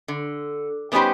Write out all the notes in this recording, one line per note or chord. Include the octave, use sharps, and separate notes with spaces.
D3
G3 B3 C#4 D#4 G4 C5